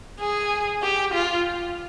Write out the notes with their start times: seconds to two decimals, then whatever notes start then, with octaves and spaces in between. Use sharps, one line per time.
0.20 G#4
0.82 G4
1.14 F4